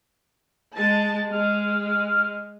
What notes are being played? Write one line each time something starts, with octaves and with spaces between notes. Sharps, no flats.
G#3 A5
G#3 F6